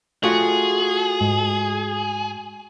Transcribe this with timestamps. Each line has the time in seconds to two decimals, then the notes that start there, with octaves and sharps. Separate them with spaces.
0.23 A3 F4 F#4 G#4
1.21 G#2